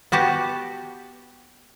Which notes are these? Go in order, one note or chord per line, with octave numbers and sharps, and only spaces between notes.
B3 F#4 G4 A5